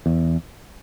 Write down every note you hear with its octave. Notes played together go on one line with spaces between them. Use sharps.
E2